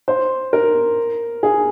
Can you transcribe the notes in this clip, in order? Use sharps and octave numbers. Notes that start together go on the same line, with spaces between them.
C5
A#4
G#4